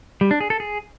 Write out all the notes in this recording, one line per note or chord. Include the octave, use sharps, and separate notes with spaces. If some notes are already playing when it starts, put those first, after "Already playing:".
G3
D4
G#4
A4
G#4